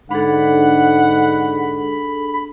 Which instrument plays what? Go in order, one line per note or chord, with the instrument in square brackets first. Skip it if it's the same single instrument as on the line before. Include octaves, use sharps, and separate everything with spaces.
[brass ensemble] G#2 D3 [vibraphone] D4 G#4 A4 [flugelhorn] F#5 [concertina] B5